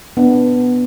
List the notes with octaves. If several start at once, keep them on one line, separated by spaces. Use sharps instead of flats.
B3 D4